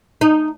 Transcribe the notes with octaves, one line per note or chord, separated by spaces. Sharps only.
D#4